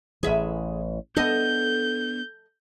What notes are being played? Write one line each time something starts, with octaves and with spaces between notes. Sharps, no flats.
A1 E3 G#4 E5
B3 D4 A4 D#5 G6